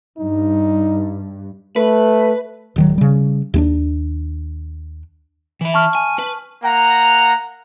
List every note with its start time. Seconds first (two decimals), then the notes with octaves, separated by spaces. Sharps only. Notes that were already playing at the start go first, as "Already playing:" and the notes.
0.18 G2 D#4
1.76 A3 B4
2.76 D1 D#3 F#3
2.98 C#3 G3
3.54 D#2 B3 D4
5.61 E3 E4
5.74 A5 C#6 F6
5.95 G#5
6.19 B4
6.63 A#3 F#5 A#5